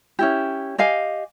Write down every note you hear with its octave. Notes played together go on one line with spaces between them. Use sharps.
C#4 E4 G4
G4 D#5 F5 G#5